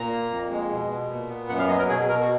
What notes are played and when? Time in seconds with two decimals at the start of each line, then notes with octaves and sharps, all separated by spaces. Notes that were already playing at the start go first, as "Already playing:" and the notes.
Already playing: A#2 A#5
0.12 A#3
0.31 F2
0.51 G#3
0.71 B2
0.90 B2
1.09 A#2
1.29 B3
1.49 F#2 F#5
1.59 F5
1.69 F#3 D#5
1.79 A#4
1.89 B2 G#4
2.09 B2 A#4
2.21 F#4